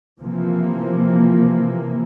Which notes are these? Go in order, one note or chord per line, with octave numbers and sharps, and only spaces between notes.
C3 E3 F3 A#3